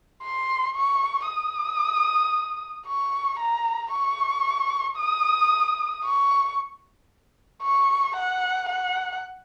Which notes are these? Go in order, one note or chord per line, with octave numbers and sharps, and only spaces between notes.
C6
C#6
D#6
C#6
A#5
C#6
D#6
C#6
C#6
F#5
F#5